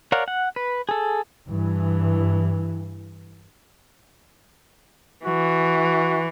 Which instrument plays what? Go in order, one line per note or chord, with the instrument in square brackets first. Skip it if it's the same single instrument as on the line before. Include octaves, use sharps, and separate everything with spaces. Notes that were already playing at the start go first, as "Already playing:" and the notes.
[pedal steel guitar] A#4 C#5 D5 F5 F#5
F#5
B4
G#4 A4
[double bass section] G2 E3
[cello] E3 [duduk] F#4